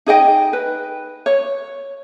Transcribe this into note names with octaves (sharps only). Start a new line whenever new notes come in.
D#4 G#4 D#5 G5
B4
C#5